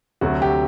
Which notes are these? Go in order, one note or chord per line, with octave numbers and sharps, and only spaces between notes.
D2 C3 F#3 A3 F#4
G4